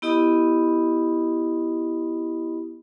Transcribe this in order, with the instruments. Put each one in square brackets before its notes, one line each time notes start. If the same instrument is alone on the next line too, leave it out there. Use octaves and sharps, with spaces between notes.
[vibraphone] B3 E4 G4 D#5 B5 D#6